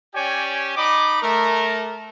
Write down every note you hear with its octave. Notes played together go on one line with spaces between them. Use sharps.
C#4 G4 C#5 D5 G5 G#5
D#4 D#5 B5 D6
A3 A#4